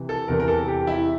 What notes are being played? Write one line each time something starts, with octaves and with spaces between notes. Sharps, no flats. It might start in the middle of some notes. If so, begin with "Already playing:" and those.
Already playing: C3 E3
A4
E2 C3 E3 A#4
A#4
A4
G4
E4